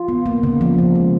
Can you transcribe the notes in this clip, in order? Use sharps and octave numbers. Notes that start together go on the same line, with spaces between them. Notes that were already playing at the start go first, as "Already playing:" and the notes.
Already playing: F4
B3
A#3
C#3
F3
C#3
G#3